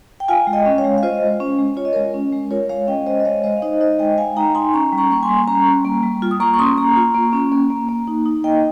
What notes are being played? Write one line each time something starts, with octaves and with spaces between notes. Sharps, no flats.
G5
F4 F5 G#5
G#3
D#5 G5
C#4
C#5 F5
G#3
F5
F4 C5 D#5
G#3
C#4
G#3
F4 C#5
D#5
G#3 A#4 C#5
C#4
G#3
F4 A#4 C#5
G#3 C#5 F5
C#4 D#5 G5
G#3 C5 D#5
D#5
G#3 C#5 F5
G#3 C5 D#5
F5
D#4 C5 D#5
D#4 C5 D#5
G#3 D#5 G5
G#3 F5 G#5
D#4 G5 A#5
D#4 G#5 C6
C#4 A#5 C#6
G3
A#5 C#6
A#3 C#6
G#5 C6
G3
C#4 A#5 C#6
G3
A#3
G3
F4
D#6
A#3 A#5 C#6
C#6
C#4 C6 D#6
A#3 A#5 C#6
F4
A#3
C#4
A#3
A#3
A#3
D#4
D#4
A#3 D#5 G5